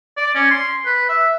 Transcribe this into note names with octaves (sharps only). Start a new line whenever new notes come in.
D5
C#4
C6
B4
E5